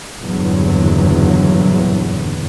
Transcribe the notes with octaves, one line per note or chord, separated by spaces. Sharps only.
F#1 E2 G2 A#2 D3 F#3